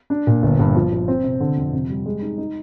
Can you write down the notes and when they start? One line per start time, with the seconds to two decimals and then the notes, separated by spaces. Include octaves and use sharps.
0.10 D4
0.27 A#2
0.42 G1
0.59 G2
0.75 F3
0.92 F3
1.08 C4
1.24 C3
1.40 D3
1.57 F2
1.73 C3
1.89 G3
2.06 G#3
2.22 D#4
2.38 D#4